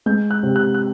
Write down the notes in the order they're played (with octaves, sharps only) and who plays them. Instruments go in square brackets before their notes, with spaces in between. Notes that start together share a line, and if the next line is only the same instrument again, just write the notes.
[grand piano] G#3 G6
F#6
C3
F#6
F#6